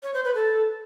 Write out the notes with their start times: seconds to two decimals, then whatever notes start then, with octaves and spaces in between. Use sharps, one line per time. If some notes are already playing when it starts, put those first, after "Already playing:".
0.03 C#5
0.14 C5
0.24 B4
0.35 A4